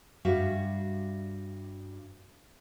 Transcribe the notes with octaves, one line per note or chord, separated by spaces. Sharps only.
G2 G3 F#4 E5 F5